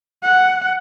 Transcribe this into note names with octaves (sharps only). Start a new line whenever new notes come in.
F#5